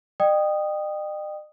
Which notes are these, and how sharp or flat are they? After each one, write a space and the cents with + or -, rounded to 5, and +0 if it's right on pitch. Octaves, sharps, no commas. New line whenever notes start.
D#5 -45 G5 +0 D#6 -5